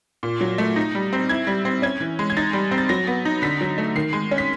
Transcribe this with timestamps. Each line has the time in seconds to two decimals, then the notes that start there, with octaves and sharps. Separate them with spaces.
0.23 A#2
0.41 F#3
0.58 A3
0.76 D#4
0.95 G3
1.13 C4
1.29 E4 G#6
1.47 G3
1.65 C4
1.82 C#4 G#6
2.00 E3
2.19 G#3
2.30 G#6
2.37 D#4 A6
2.53 G3
2.71 C4
2.78 A6
2.89 F#3 A#6
3.07 B3
3.25 D#4
3.42 D3 B6
3.61 F#3
3.78 A3
3.95 D#3 C7
4.13 G#3
4.31 C#4
4.38 B6